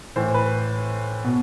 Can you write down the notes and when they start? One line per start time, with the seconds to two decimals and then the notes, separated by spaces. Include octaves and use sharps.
0.16 A2 E3 C5
0.34 B4
1.24 B2